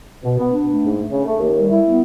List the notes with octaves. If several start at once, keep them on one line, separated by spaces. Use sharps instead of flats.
B2
B3
D4
A3
G#2
A3
C#3
A3
D#2
G3
E4
B3